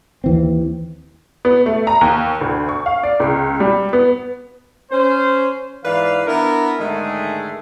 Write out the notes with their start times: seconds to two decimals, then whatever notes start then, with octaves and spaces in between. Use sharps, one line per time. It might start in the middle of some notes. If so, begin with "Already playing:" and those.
0.24 D#2 E3 C4
1.45 B3
1.66 A3
1.87 A#5
2.01 D#2
2.41 D2
2.69 C#6
2.86 F5
3.03 D5
3.20 C#2
3.60 G3
3.93 B3
4.91 C#4 C5
5.84 G#2 E3 B4 D5 F5
6.26 B3 D4 E4 A#4
6.79 G#2 D3 D#3 G#3 A3 G#4